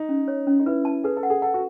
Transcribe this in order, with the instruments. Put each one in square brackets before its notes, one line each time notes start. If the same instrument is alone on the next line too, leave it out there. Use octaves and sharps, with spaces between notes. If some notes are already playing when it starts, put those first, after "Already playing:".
Already playing: [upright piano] D#4
[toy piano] C#4
C#5
C#4
[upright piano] D#4
[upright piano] E4 [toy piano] B4
[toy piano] A5
[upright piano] G#4 [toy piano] B4
[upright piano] A4
[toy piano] F#5
[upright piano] G#4
[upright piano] A4 [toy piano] F#5
[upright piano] F#4